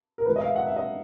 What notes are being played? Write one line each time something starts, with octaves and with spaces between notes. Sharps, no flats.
A#4
A2 E3 G#3 B4
D#5
F5
E5
F#5
E5
D#5